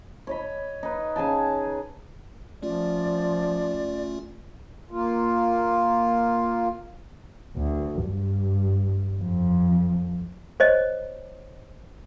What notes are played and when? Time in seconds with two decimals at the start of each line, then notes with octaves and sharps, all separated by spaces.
0.27 C#5 D#5 B5
0.83 D#4 B4
1.16 C#3 G#4 G#5 A5
2.63 F3 A3 C#4 F4 D5
4.91 A#3 F4
7.57 D2
8.04 G2
9.22 F2
10.60 C5 C#5 D#5